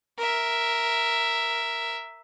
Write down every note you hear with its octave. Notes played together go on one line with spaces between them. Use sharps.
A#4 E5